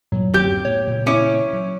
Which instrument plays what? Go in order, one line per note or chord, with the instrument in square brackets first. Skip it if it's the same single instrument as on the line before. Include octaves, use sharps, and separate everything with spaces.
[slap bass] G2 A#2 E3 [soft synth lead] F#3
[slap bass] D1 F#2 C4 [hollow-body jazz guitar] G4 [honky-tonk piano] G6
[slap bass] A2 B3 [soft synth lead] C#5
[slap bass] A#2 C#3 E3
[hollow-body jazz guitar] C#4 [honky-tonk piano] E4 D6 C#7
[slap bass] F#3